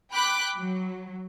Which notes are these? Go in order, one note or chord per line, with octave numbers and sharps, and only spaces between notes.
G5 B5 D6 F#6
F#3